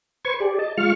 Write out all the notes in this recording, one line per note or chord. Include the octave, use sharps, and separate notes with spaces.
B4 C5 C#6 G#6
G4 G#4 D5
D#5 A5
G#3 F4 F5 C#6 F6